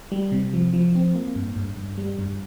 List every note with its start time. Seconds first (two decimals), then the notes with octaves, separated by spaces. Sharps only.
0.12 G3
0.32 C3
0.54 F3
0.74 F3
0.95 C4
1.15 A#3
1.36 G2
1.56 G2
1.77 G2
1.98 G3
2.19 G2